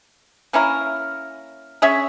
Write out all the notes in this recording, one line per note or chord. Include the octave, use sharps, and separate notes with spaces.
A#3 C#4 E4 A#4
C#4 G#4 C#5 E5